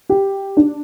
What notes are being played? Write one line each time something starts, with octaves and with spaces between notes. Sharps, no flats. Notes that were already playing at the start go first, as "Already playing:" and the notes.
G4
D4